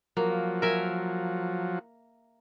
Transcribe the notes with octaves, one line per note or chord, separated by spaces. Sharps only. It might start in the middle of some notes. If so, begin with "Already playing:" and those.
F3 F#3 A#3
A#4 E5 G#5